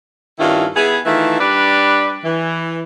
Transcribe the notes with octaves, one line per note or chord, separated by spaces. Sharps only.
G2 D#3 C#4 E4 F4
B3 E4 G#4
D#3 E3 A3 E4 F4
G3 D4 B4 D5
E3